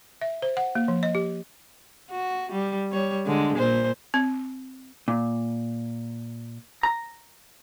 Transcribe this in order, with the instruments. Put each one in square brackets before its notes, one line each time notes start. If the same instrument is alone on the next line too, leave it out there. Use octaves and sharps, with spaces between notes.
[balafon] E5
C5
F#5
A#3
F3
D#5
G4
[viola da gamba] F#4
G3
G3 C#5
D3 G#3
A#2 C5
[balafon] C4
[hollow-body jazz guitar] A#2
A#5